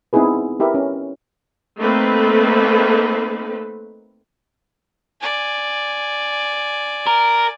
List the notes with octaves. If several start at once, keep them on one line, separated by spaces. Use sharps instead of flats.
B3 C4 D#4 E4 G#4 B4
E4 G4 A#4 B4 E5
C#4
A3 A#3 C4 D#4 A4 B4
D5 G#5
A#4